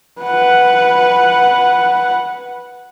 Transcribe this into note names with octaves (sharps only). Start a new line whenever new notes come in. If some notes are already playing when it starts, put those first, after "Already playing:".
B4 F#5